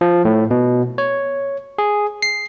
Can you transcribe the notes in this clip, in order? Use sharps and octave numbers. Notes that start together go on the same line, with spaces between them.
F3
A2
B2
C#5
G#4
C7